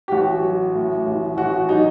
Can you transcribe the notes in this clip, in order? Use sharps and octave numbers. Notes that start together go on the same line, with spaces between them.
G4
A1 F#4
F#3
A2
A1
A1 F#4
F#4
F#3 D#4